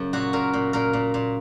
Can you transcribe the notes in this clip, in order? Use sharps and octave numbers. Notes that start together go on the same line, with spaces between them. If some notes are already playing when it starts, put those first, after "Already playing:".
Already playing: F#2 C#3
A#2 F#4
A#2 A#4
A#2
A#2 A#4
A#2
A#2